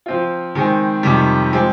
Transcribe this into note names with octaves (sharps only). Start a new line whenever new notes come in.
F3 C4 F4
D#3 G#3 C4
F2 C3 D#3 G3
F3 G#3 C4